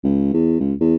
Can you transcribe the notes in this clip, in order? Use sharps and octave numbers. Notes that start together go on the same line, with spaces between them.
C#2
E2
C#2
E2